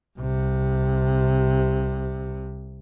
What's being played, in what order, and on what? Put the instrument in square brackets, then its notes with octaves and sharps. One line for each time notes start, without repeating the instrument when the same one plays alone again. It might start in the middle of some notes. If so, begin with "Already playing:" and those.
[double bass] C2 C3